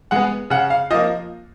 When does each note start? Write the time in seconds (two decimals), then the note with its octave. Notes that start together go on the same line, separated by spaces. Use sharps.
0.11 G#3 B3 F#5
0.50 C#3 F#5
0.70 F5
0.90 F3 D#5
0.94 A#3